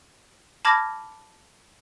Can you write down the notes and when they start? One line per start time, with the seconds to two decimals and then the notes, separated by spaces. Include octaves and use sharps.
0.65 A5 B5 D6 F6 G#6 A#6